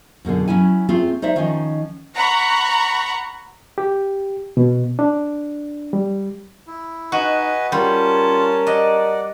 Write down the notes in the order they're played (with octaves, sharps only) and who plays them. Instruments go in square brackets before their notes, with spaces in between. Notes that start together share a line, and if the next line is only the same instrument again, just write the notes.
[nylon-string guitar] F#2 B2 D3 G#4
F#3 C#4 E4 G#5
A3 C4 F4 G#4
D#4 C5 D5 E5
D#3 F3 C#4 D#4 G#5
[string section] F#5 A#5 B5 C#6
[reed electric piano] G4
B2
D4
G3
[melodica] E4
[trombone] D#4 [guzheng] F#4 [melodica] B4 D#5 G#5
[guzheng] G3 [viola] C#4 A5 [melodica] F4 [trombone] A#4
[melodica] D5 F#5 [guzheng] D#5